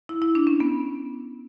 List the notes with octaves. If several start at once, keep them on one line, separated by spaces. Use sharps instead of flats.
E4
E4
D4
C#4
B3